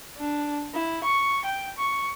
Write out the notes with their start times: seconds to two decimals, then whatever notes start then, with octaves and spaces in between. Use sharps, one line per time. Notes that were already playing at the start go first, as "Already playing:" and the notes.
0.17 D4
0.74 E4
1.04 C#6
1.45 G5
1.78 C#6